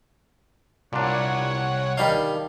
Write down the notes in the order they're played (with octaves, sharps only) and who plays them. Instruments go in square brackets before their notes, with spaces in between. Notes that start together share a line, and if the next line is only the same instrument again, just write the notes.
[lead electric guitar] C2 [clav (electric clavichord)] A#2 D4 [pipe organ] C#5 F#5
[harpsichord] D#3 D4 D#4 [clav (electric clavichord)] G3 F5